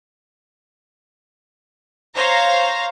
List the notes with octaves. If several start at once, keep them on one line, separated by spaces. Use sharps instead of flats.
C5 C#5 F5 A#5 A#6